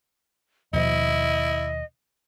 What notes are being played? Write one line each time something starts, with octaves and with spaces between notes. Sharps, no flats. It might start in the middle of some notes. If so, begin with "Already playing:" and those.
D#2 B2 F3 E4 D#5